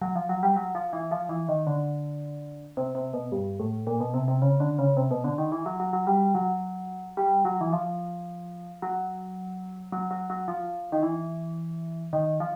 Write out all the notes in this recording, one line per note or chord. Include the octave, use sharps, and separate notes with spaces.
F#3
F3
F#3
G3
F#3
F3
E3
F3
E3
D#3
D3
C3
C3
B2
G2
A2
A#2
B2
C3
C3
C#3
D3
C#3
C3
B2
D3
D#3
E3
F#3
F#3
F#3
G3
F#3
G3
F#3
E3
F3
F#3
F#3
F#3
F#3
F3
D#3
E3
D#3
F3